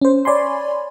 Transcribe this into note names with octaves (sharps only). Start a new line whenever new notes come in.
C#4 C5
C#5 D5 G#5 B5 C6